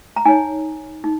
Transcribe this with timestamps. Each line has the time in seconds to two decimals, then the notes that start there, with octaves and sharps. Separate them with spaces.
0.16 A#5
0.25 D#4 C#5 G#5
1.04 D#4